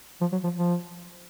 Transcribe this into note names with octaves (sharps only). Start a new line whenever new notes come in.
F3
F#3
F3
F3